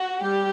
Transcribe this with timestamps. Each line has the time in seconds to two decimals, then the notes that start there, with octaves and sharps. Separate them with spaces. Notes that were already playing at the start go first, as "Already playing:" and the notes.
Already playing: F#4
0.22 G3 G4